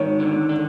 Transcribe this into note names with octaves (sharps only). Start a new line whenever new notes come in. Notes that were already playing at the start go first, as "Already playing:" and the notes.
Already playing: G#2 D#3 C#5
D3
D3